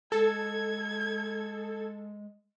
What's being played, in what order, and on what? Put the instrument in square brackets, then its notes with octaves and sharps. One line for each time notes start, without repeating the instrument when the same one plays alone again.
[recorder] G#3 [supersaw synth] A4 [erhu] G#6